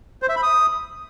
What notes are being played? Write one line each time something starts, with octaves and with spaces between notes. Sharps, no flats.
C5
E5
B5
D#6